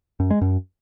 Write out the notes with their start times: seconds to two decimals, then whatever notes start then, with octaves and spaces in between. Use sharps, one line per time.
0.20 F#2
0.31 G#3
0.41 F#2